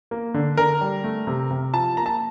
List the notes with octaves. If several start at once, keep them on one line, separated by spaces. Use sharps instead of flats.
A#3
D3
D3 A#4
G3
A3
C3
C3
F3 A5
A#3 A#5
A5